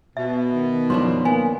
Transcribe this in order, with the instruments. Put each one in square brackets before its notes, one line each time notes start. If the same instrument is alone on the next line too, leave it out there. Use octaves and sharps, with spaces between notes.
[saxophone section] B2 [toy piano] E5
[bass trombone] D#3
[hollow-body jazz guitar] F#2 F3 D4 [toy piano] C6
[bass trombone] A#3 [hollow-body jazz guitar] B3 [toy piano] G#5